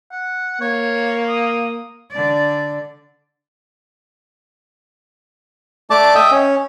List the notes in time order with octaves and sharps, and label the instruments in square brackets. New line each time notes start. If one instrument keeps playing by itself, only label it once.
[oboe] F#5
[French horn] A#3 [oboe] C#5
[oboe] D#6
[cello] D3 D5
[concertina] A3 D5 A5 D6
D#5 E5 G5
C#4